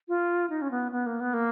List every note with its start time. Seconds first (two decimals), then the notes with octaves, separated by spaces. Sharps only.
0.08 F4
0.50 D#4
0.62 C#4
0.71 B3
0.92 B3
1.06 A#3
1.20 B3
1.34 A#3